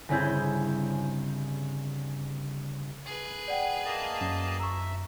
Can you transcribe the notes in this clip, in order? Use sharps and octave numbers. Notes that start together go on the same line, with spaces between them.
G1 C#3 C4 E4 G#4 G6
G#4 B4
D5 F#5 G5
A#3 D#5 A5
F#2
E5 A#5 C#6